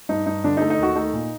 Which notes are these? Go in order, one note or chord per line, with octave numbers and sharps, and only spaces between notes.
G2 D#4
G2 D#4
D3 D4
A3 D#4
D#4
D#2 F#4
A3 D#4
A#2